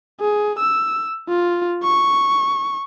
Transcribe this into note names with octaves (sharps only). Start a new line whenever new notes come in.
G#4
E6
F4
C#6